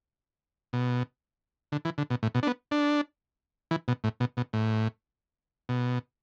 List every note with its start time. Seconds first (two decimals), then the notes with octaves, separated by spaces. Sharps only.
0.73 B2
1.72 D3
1.85 E3
1.98 D3
2.10 B2
2.23 A2
2.35 B2
2.43 D4
2.47 B3
2.71 D4
3.71 E3
3.88 B2
4.04 A2
4.20 B2
4.37 B2
4.53 A2
5.69 B2